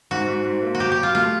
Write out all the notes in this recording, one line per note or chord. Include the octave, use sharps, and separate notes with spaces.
G#2 F#4
G#2
G#2
A#3
F#4
F#3 G4
G4
F#3 F4
A3 F4